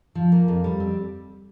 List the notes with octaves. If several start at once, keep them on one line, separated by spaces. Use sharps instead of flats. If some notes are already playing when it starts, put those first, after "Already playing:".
F3
A#3
F2
G3
C4